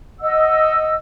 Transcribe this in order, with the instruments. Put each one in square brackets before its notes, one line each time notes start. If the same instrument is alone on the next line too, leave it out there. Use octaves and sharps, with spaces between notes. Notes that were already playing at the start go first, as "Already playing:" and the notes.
[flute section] D#5 F#5 E6